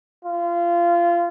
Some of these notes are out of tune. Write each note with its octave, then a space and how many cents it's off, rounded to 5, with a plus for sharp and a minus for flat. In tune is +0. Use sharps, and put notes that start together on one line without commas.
F4 -25